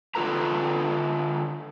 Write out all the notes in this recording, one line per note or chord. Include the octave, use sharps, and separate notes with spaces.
D3 F4 A4 B4 A#5